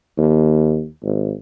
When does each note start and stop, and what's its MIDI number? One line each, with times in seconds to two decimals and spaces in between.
0.18 0.86 39
1.04 1.34 32